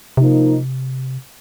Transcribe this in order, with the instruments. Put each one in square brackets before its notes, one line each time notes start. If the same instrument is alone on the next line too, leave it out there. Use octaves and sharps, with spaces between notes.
[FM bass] C3 [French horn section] F3 A#3 D#4